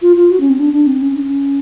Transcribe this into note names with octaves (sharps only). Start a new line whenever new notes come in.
F4
F4
F#4
C#4
C4
D4
D4
C4
C#4
D4
C#4